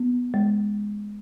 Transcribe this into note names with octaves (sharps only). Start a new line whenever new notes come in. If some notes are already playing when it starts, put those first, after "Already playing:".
Already playing: B3
G#3